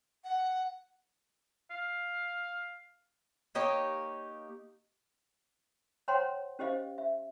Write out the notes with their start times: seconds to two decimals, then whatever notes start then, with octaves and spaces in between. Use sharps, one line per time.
0.24 F#5
1.71 F5
3.55 A#3 D#4 G4 C#5
6.08 C5 C#5 F#5 G5 A#5 C6
6.59 C#4 G4 C5 D#5 F5
6.98 E5